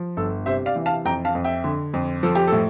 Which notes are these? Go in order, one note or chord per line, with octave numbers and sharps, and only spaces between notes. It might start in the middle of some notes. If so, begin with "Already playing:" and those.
Already playing: F3
G1 A4
C3 C5 E5
D5 F5
E3
F5 A5
F2 G5 A#5
F5 A5
F2
E5 G5
D3
F2
F3 A4
G4
A2 A4